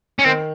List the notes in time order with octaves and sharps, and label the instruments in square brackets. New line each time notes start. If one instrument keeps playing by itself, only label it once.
[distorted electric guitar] C#4
[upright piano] D#3 [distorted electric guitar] C4